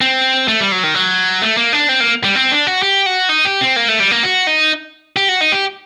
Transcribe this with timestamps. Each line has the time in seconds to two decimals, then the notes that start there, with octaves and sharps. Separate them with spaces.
0.01 C4
0.48 A3
0.60 G3
0.72 F#3
0.83 D#3
0.95 F#3
1.42 A3
1.57 A#3
1.73 D4
1.89 C4
2.00 A#3
2.24 G3
2.35 C4
2.51 D4
2.67 F#4
2.82 G4
3.06 F#4
3.29 D#4
3.45 G4
3.61 C4
3.76 A#3
3.88 A3
4.00 G3
4.11 A#3
4.23 F#4
4.47 D#4
5.16 G4
5.29 F#4
5.41 D#4
5.52 G4